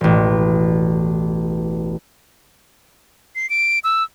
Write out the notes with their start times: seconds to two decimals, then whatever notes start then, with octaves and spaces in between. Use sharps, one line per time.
0.01 E1 A1
3.35 C7
3.50 D7
3.84 E6